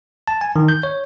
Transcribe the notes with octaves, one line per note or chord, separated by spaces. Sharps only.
A5
G#5
D#3
G6
C#5